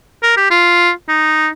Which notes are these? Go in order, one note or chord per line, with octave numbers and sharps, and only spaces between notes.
A#4
G4
F4
D#4